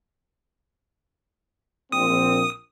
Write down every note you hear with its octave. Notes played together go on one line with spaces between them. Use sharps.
A#1 C4 D#6